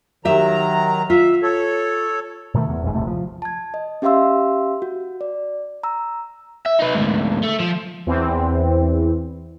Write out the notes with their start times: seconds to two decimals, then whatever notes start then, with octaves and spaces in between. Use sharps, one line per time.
0.25 D#3 F#3 G4 E5 A#5
1.10 F4 E5
1.42 A4 C#5
2.54 B2 D#3 F3 A3
2.69 E2
2.82 F1 A#1 G#2
2.94 E1 A1 C3 A3
3.07 F3
3.42 A5 G#6
3.74 D#5
4.02 C#4 G4 E5 F5 C6 E6
4.82 F#4
5.21 D5
5.83 A#5 E6
6.66 E5
6.79 D#4 B4
6.95 D2 G#2
7.44 A3
7.60 F3
8.06 E2 E3 C4